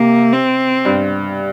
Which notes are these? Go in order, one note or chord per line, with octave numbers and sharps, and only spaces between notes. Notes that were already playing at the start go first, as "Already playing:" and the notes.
Already playing: C3 A#3
C4
G2